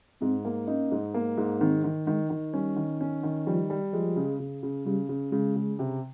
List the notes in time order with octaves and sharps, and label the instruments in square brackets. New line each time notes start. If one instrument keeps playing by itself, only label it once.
[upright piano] G#2 [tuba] C4
[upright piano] A#3
[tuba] C#4 [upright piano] D#4
[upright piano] G#2
A#3
G#2
[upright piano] D#3 [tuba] C4
[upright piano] D#3
[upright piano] D#3 [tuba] G#3
[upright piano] D#3
[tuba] G3 [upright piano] C#4
[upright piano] D#3
C#4
D#3
[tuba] F3 [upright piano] G3
[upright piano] G3
[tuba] F3 [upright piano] G#3
[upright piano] C#3
C#3
C#3
[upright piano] C#3 [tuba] G3
[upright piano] C#3
[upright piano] C#3 [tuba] G#3
[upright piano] C#3
C3